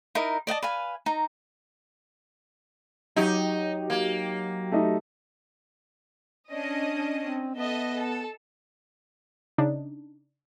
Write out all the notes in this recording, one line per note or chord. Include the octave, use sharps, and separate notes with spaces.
D#4 E4 A#4 D#5
D5 D#5 F#5 A5
B4 F5 G#5
D#4 A#5
F#3 D#4 G4
A#3
A3 D#4
C#4 D4 D#5
C4
B3 A4 D#5 E5
A4
C#3 D4 D#4